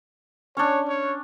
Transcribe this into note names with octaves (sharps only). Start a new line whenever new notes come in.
C#4 D4 C#5
C#5